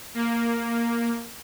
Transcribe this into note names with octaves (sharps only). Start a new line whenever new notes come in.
A#3